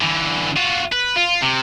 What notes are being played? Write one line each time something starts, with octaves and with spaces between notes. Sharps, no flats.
D3 E3
F4 F#4
B4
F4
C3